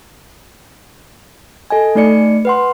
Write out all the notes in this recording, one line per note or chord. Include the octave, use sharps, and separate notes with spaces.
A4 D#5 G#5
A3 D#4 D5 C#7
B4 F#5 C6